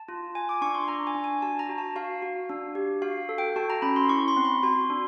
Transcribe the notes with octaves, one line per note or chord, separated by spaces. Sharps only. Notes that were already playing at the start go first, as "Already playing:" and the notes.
Already playing: A5
F4
F4 G#5
D6
D4 C#6
C6
D4 A#5
G#5
D4
G#5
F#4 A5
A#5
F#4
A5
F#4 F5
F#4
D4
G4
F#4 F5
A4
G5
F#4 A5
A#5
C#4 B5
C6
E4 C#6
C6
C4
B5
F#4 C6
D4